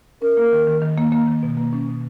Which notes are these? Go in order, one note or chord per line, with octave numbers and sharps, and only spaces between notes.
C#4 A#4
A#3
D#3
D#3
D#3
A#3
A#3
D#3
B2
A#3
C#4
B2